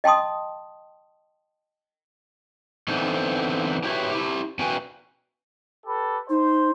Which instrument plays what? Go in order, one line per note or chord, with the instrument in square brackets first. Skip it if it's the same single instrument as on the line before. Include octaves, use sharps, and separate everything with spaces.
[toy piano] D#5 G5 A5 C6 D#6
[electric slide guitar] D3 E3 A3 B3 C4 D#4
E4 F#4 G4 B4 C#5 E5
E4 G4
E2 C#4 F#4 B4 G5 G#5
[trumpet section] G4 A4 B4
[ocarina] D#4 [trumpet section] C5